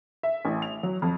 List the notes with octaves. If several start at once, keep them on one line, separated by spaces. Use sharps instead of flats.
E5
A1
F7
F#3
F2